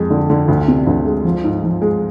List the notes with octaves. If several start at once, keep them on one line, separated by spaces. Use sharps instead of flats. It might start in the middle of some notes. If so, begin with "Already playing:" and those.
Already playing: F2 G#3
D3
D3
D2
C3
D2
G#3
F3
G#2
F3
G#3